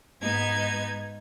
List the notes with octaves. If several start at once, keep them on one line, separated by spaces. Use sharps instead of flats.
G#2 B3 D#4 G#6